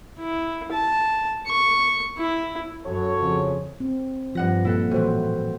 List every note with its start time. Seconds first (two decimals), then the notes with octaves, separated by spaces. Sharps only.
0.20 E4
0.72 A5
1.47 C#6
2.18 E4
2.85 F#2 F#4 A4 C#5
3.17 F2 C#3
3.80 C4
4.35 G2 F3 F#5 A#6
4.65 A#2 E4 A4 F#5
4.91 A2 E3 F#4 C5